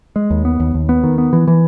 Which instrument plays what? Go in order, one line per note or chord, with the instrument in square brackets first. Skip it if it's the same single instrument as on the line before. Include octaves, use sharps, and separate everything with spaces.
[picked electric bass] G#3
D#2
B3
D#2
D#2
B3
D#3
B3
E3
E3